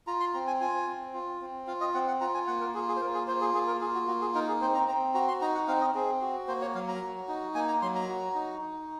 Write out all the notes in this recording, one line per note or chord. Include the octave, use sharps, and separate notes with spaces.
F4 A#5
C6
C4 A#5
G#5
F4 G#5
C4
F4
C4
F4 F5
D#5
C4 F#5
F#5
F4 A#5
G#5
A#3 F#5
A#4
F4 G#4
G#4
C5
A#3 A#4
G#4
F4 C5
G#4
A#3 G#4
A#4
F4 G#4
F#4
A#3 F#4
G#4
D#4 A#4
G#4
C4 C5
A#5
C4 A#5
F#4 A#5
C6
D#4 A#5
F#5
C4 F5
D#5
C4 G#4
F#4
A#3 C5
C#5
F#3 F5
A#5
F#4
D#4
A#3 G#5
A#5
F#3 C6
A#5
F#4
D#4
D#4